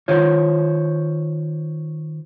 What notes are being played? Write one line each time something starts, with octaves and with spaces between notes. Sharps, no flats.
D#3 F4 C5 C#5